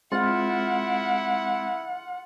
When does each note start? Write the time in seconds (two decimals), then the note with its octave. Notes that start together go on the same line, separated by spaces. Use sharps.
0.12 G#3 C4 E4 F4 F#5